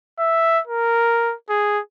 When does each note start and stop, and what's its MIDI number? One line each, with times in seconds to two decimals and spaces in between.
0.19 0.61 76
0.67 1.35 70
1.50 1.80 68